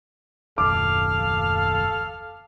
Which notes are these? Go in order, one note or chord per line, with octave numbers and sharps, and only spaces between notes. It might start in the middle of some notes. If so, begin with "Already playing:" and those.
F#1 D#2 A4 F5 D6